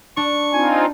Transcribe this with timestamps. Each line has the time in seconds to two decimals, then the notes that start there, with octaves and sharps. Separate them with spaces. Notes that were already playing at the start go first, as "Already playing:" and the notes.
0.17 D4 C#6
0.52 C4 D#4 F4 G#5